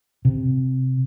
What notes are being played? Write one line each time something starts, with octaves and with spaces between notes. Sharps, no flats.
C3